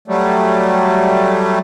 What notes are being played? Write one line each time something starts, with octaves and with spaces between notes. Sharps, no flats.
F#3 G3 A3